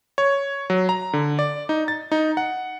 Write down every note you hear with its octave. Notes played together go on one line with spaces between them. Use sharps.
C#5
F#3
A#5
D3
D5
D#4
A6
D#4
F#5